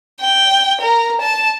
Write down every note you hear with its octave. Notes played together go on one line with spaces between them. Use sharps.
G5
A#4
A5